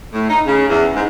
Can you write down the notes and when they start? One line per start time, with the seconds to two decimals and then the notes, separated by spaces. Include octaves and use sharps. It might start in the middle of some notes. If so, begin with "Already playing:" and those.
0.13 A2
0.30 D#4
0.46 C#3
0.68 E2
0.94 G#2